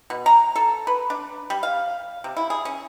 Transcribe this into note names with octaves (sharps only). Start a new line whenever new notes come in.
B2
A#5
A4
B4
D4
G3
F5
C3
E4
G#4
C#4